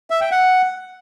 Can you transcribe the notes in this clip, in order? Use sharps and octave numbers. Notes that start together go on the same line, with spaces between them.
E5
G5
F#5